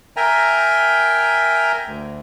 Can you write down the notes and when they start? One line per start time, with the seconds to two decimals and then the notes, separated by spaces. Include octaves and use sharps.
0.17 A#4 E5 G5 G#5 A#5
1.87 D2